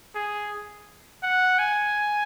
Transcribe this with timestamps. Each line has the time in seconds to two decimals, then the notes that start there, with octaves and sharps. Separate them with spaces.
0.15 G#4
1.23 F#5
1.59 G#5